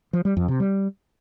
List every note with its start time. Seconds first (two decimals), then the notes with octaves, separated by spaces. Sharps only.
0.13 F3
0.25 G3
0.37 F2
0.48 C3
0.60 G3